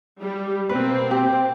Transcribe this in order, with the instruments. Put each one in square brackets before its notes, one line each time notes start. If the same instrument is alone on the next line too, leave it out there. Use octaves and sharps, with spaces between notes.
[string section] G3
[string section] B2 A#3 C4 [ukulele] B4
[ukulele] G4